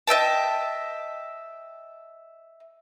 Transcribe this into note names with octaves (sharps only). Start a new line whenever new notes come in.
D#5 E5 G5 A5